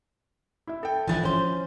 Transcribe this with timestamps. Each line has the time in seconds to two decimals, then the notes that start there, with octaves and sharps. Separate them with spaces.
0.67 E4 E5
0.83 A4 G5
1.08 D3 E3 F3 E4 A6
1.23 C#4 C5